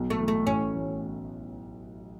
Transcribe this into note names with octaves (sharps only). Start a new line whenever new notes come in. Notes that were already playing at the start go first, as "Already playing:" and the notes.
Already playing: B1
A3
E3
A3
A1 C#4
E3